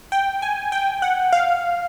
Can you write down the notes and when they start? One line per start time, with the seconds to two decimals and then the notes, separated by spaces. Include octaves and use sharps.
0.12 G5
0.42 G#5
0.72 G5
1.02 F#5
1.33 F5